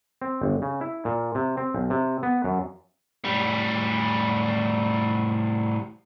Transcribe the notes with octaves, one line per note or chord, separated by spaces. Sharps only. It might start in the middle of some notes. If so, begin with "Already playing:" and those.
C4
G1
C#3
E4
A#2
C3
C4
B1
C3
B3
F#2
A2 G3